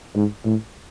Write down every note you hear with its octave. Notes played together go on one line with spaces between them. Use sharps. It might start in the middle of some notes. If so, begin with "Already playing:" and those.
G#2
A2